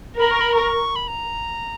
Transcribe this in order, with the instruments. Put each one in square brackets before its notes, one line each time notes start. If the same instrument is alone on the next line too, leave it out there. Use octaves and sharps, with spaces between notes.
[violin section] A#4 [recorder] B5
[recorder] C#6
B5
C#6
B5
A#5